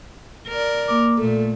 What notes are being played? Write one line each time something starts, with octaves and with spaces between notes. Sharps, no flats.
A#4 D5
A#3 D6
A#2 A3 A4